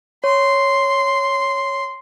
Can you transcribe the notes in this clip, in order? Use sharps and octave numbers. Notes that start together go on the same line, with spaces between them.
C#5 C6